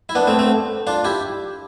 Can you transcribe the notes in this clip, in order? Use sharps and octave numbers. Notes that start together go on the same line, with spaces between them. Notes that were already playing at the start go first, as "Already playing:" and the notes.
E4
B3 D4
A3 C4
A3 C4
D4 F4
E4 G4